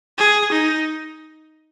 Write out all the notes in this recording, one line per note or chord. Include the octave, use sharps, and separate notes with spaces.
G#4
D#4